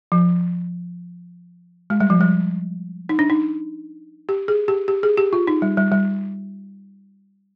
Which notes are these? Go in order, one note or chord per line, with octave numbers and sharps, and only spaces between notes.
F3
G#3
G3
F3
G3
D#4
D4
D#4
G4
G#4
G4
G4
G#4
G4
F4
D#4
G3
G3
G3